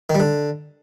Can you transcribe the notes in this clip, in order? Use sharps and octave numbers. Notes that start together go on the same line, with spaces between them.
D#3
G3
D3